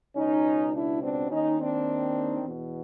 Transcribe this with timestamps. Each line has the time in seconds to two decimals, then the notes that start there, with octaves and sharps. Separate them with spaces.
0.17 C#2 B2 C#4 D#4
0.73 D4 E4
1.01 C4 D4
1.29 D#2 D#3 C#4 D#4
1.58 C4 D4
2.43 E2 B2